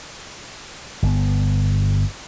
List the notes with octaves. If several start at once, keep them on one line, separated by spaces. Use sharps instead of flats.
G1 B3